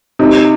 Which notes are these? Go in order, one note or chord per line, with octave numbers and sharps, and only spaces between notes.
C3 D#4